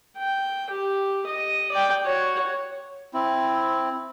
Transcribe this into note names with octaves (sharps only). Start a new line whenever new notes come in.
G5
G4
D#5
D5 G5
F#4 C#5
C4 E4